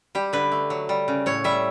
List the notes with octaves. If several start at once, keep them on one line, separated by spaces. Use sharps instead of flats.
G3 G4
D3 B4
A3
F#3
G3
C#3
A2 C#5
G3 E5